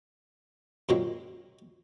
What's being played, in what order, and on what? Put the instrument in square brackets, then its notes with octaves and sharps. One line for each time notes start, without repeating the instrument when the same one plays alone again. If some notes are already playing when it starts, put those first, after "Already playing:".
[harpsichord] F#2 A#2 F#3 G#3 C4